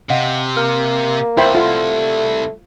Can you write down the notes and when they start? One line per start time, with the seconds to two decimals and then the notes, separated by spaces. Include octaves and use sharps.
0.10 C3 D#5 F5 F#5
0.57 A#3 F6
1.37 C2 E4 C5 E5 G5 B5
1.55 A3 F4 F#5